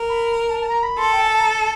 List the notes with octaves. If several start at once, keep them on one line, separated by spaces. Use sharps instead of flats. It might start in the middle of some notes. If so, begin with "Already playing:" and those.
Already playing: A#4
B5
A5
A5
A#5
B5
A4 C6
G5
G#5
A5
A#5
A5